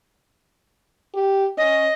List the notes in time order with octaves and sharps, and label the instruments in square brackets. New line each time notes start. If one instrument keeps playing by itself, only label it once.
[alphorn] G4
[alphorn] C#4 [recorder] D#5